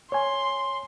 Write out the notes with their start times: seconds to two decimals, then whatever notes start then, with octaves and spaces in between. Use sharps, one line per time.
0.12 C#5 G#5 C6